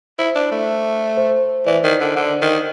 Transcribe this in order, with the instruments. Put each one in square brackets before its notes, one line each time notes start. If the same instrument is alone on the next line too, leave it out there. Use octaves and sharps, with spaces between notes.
[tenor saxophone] E4 [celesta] C5
[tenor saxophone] D4
A3
[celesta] C5
[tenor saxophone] E3 [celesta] D5
[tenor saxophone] D#3
D3
D3
D#3